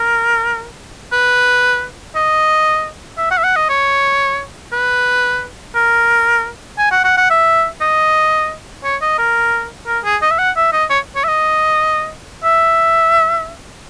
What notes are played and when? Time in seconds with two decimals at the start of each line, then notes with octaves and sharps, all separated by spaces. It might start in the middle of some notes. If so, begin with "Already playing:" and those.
Already playing: A#4
1.12 B4
2.15 D#5
3.18 E5
3.31 F#5
3.38 E5
3.44 F#5
3.56 D#5
3.69 C#5
4.73 B4
5.75 A#4
6.78 G#5
6.91 F#5
7.04 F#5
7.17 F#5
7.30 E5
7.81 D#5
8.84 C#5
9.01 D#5
9.19 A#4
9.87 A#4
10.04 G#4
10.22 D#5
10.31 E5
10.39 F#5
10.56 E5
10.73 D#5
10.90 C#5
11.16 C#5
11.24 E5
11.29 D#5
12.44 E5